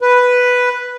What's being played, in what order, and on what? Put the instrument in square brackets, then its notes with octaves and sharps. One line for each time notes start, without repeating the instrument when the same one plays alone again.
[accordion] B4